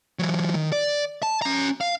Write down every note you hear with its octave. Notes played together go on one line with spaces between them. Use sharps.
E3 F#3
D#3
D5
A5
C#4 A#5
F5